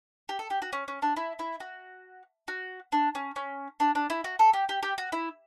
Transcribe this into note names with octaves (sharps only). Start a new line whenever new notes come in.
G4
A4
G4
F#4
C#4
C#4
D4
E4
E4
F#4
F#4
D4
C#4
C#4
D4
D4
E4
F#4
A4
G4
G4
G4
F#4
E4